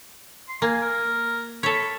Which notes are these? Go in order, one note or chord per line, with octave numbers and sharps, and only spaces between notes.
C6
A#3 G#5
A#4
A4 C#5 B5